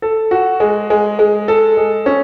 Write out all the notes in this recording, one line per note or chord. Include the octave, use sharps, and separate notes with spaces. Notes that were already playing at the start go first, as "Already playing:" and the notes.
A4
F#4
G#3
G#3
G#3
A4
G#3
C#4